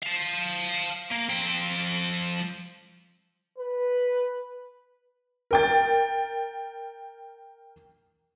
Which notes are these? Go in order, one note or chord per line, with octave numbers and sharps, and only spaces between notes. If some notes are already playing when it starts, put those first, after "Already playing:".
F5 A5
A#3
F3 G5
B4
A#4 G5 A6